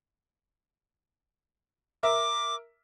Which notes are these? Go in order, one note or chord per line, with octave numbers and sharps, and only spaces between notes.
A#4 E5 D6